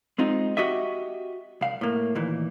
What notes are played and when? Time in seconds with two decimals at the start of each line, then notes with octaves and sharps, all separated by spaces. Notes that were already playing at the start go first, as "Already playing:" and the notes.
0.18 G#3 C4 D#4 F4
0.57 F#4 G4 D#5 E5
1.61 C2 F5
1.81 A2 A#3
2.15 D#2 A#2 E3